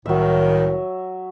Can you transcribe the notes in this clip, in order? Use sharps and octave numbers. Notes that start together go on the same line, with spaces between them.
C2 A2 D#3 F#3 E5